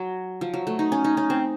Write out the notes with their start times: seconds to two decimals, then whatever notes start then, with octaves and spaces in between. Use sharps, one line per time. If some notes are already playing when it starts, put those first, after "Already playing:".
Already playing: F#3
0.41 F3
0.54 F#3
0.67 A3
0.79 D#4
0.92 C#4
1.04 D#4
1.17 C#4
1.30 C4